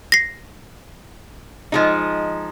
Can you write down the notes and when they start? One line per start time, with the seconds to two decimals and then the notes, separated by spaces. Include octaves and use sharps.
0.12 A#6 C7
1.72 F3 G#3 D#4